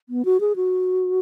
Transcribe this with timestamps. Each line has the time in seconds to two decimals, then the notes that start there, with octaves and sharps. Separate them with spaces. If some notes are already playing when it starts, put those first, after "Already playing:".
0.09 B3
0.25 F#4
0.40 G#4
0.56 F#4